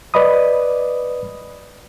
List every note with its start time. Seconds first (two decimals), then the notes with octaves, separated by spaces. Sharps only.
0.14 B4 D5 D#5 B5 D#6